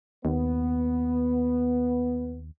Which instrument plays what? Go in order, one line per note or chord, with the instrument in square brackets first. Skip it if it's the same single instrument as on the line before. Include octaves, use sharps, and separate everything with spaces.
[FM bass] D#2 [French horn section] B3